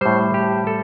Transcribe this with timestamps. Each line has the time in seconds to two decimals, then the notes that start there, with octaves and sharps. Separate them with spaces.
0.01 A2 G3 C5
0.34 G4
0.67 A4